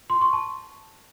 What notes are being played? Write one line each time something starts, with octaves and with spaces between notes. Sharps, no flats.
C6
C#6
A5